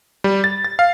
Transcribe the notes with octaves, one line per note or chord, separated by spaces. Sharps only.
G3
A6
A6
F5